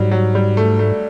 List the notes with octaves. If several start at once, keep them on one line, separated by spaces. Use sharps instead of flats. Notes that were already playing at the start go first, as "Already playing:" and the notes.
Already playing: G#2 F#3 G3
F#3
G3
A3
A3